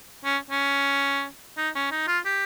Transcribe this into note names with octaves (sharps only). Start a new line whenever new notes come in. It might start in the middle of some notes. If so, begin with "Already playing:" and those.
C#4
C#4
D#4
C#4
D#4
F4
G4